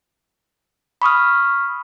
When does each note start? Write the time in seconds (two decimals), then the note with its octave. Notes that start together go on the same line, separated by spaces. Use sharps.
1.02 B5 C#6 D#6 F6